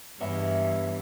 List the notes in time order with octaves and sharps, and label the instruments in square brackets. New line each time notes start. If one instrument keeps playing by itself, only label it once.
[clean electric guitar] B1 B3 E5 [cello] G2 E3